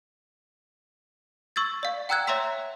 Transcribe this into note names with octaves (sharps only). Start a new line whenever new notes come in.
C#6 E6 G#6 A6
D5 F5
F#5 G5 A#5 E6 F#6 G#6
C#5 E5 A#5 C6 E6 B6